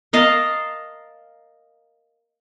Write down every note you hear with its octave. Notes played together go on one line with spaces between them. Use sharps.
A#4 D#5 F5 A5